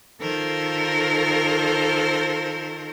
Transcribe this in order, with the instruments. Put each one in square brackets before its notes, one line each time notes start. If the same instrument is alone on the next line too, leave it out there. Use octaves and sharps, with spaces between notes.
[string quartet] D#3 F4 A4 A#4 C5